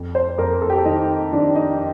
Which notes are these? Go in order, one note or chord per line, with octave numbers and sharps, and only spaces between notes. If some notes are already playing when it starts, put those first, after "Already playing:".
Already playing: F2
C5
F2 A#4
A4
G4
A4
D#3 D#4
D#3 D4
D#4